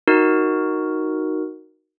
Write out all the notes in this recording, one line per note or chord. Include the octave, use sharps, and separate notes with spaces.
D#4 F#4 A#4